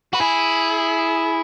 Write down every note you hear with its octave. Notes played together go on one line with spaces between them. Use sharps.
F#4 B4
E4 G#4